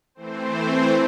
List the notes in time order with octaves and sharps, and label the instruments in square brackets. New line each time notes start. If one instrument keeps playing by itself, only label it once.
[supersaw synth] E3 A3 C4 C5